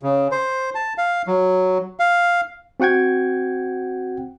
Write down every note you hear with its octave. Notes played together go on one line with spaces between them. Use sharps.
C#3
C5
A5
F5
F#3
F5
C4 F#4 F#5 G5 G#6